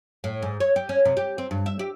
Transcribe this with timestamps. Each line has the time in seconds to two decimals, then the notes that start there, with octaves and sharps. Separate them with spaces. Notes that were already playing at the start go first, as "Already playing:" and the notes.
0.24 A2
0.42 G#2
0.60 C#5
0.76 G4
0.89 C#4
1.05 C3
1.17 G4
1.38 C4
1.51 G2
1.66 E5
1.79 G4